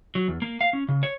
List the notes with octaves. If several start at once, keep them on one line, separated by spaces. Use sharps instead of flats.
F#3
E2
A#3
F5
C#4
C#3
C#5